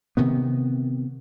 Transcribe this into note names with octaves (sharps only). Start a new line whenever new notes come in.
C3 D#3 B3